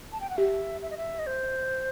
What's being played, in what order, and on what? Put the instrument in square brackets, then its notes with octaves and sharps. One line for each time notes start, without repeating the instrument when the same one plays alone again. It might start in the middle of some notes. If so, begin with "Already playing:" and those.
[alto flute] A5
G5
F#5
[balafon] G4 [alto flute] E5
[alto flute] E5
D#5
E5
D#5
C5